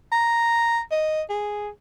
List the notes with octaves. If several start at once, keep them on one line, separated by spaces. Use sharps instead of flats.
A#5
D#5
G#4